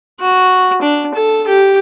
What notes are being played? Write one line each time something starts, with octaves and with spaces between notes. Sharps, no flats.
F#4
D4
A4
G4